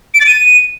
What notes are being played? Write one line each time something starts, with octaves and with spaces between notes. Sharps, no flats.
D7
A6
D#7